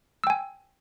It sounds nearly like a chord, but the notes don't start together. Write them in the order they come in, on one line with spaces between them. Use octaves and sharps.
E6 G5 G#5